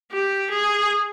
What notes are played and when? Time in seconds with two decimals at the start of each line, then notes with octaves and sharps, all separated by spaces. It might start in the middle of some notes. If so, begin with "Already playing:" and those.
0.11 G4
0.50 G#4